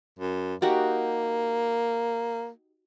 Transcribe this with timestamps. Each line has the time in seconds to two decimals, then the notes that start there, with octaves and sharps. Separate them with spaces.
0.19 F#2
0.62 A#3 D#4 F#4 G4